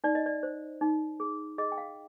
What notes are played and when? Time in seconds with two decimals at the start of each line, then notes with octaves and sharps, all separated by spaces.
0.04 D#4 D5
0.15 D#5
0.26 D5
0.43 C5
0.81 D#4
1.20 G#4
1.58 G#4 D#5
1.72 G5
1.78 F5